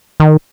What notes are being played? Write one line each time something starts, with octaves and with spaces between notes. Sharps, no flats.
D#3